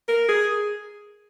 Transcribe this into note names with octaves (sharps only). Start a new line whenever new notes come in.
A#4
G#4